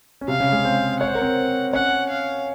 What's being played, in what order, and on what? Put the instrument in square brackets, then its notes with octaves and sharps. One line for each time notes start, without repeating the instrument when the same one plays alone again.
[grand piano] C#4
[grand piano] C3 C4 [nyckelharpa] F5
[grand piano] C#3 C#4
G#3 G#4
C4 C5
[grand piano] C#5 [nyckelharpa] F#5
[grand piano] C5
A#4
C4 C5
[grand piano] C#4 C#5 [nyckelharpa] F#5
[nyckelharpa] F5